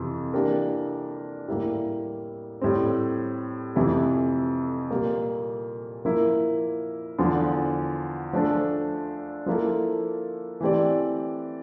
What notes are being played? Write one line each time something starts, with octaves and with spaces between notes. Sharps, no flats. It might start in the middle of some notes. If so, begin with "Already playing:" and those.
Already playing: F2 C3 E3
E3 A#3 D4 G4 A#4
A2 G3 A#3 E4 G4
A2 G3 C4
F2 C3 E3 A3 E4
A#2 G3 A#3
F3 A#3 E4 A#4
E2 D3 F3
F3 A3 D4 A4 C5
F3 A#3 E4 A4
E3 A3 C4 G4 D5